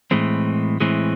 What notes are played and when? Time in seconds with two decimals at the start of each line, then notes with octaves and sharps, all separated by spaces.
0.11 A2 E3 G#3 C4
0.80 A2 E3 G#3 C4